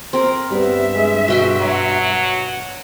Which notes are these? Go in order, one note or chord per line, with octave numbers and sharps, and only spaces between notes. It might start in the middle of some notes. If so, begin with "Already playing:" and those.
C4 A#4
G2 G3 B3 E5
G#3
B2 F#4 G5 C6
F#3